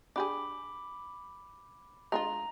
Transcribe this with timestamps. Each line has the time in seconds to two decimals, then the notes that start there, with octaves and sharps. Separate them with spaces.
0.16 D4 G4 G#4 B5 D6
2.12 G#3 D4 F4 A#5